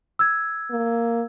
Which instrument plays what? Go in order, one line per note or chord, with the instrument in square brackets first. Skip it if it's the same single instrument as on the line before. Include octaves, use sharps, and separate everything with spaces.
[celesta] E6 G#6
[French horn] A#3